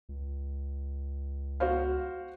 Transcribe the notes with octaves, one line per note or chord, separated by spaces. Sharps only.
C#2
F#4 C5 F5